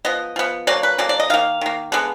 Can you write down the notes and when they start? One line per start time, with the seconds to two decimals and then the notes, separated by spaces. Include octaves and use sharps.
0.05 F3 B3 D#5
0.36 F3 B3
0.67 D3 F#3 A#3 D5
0.83 B4
0.98 D3 F#3 A#3 D5
1.09 D5
1.20 D#5
1.30 D#3 A#3 F5
1.61 D#3 A#3
1.92 D3 G#3 B3